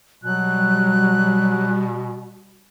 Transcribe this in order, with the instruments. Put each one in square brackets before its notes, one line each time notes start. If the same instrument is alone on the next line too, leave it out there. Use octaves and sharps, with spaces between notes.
[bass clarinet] B2 [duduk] F#3 [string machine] G3 [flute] F#6